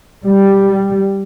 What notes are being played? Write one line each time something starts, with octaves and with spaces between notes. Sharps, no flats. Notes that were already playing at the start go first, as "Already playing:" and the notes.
G3